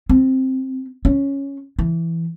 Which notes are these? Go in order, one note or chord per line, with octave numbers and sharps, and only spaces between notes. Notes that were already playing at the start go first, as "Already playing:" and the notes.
C4
C#4
E3